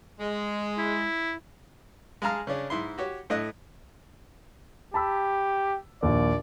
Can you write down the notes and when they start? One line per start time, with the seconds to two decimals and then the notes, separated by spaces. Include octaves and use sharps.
0.20 G#3
0.78 E4
2.22 G#3 G#4 F5 A5 A#5 F6
2.47 C#3 C#4 D4
2.70 G#2 E4 C6
2.98 F#4 G4 C#5
3.30 A2 A3 D#5 F#6
4.94 G4 A5 B5 E6
6.03 A#1 D#2 D5